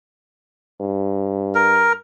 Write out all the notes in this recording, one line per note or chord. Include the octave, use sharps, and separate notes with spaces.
G2
A#4